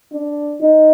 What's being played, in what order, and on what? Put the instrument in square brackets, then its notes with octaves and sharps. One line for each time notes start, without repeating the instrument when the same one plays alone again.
[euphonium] D4
D#4